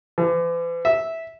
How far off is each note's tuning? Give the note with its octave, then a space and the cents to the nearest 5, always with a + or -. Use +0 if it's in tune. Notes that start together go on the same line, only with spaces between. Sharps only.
E3 +45
E5 -10